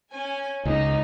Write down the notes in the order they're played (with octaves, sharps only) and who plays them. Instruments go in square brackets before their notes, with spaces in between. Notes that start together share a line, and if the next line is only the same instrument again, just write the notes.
[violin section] C#4 G#5
[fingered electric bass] C#2 C#3 [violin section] D#4